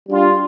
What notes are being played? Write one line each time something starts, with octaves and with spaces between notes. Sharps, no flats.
G3 D4 F4